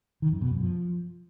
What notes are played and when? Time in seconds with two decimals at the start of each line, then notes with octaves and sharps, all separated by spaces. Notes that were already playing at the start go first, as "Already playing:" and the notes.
0.22 D#3
0.32 F#2
0.42 B2
0.51 F#2
0.61 F3